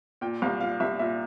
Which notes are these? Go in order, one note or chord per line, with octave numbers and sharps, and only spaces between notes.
A#2 G5
C2 F5
A#2 F5
C2 E5
A#2 E5